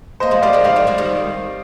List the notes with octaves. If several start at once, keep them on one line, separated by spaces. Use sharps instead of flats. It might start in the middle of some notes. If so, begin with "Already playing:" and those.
A#3 C5 D#5
F3 G#3
G3 A#3 D5 F5
F3 G#3
D#3 G3 D5 F5
F3 G#3
F3 G#3
D#3 G3